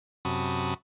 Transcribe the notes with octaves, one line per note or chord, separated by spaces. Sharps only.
F#2 C3 F#4 A5 B5 D#6